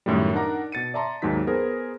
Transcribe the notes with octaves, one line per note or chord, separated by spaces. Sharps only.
F#2 A2 D#3 G3
D4 D#4 A#4 F#5 A#5 D6
B2 A6 C#7 D#7
D5 E5 A5 A#5 C6
D#2 G#2 F#3 D#4 B6
B3 G#4 A#4 C5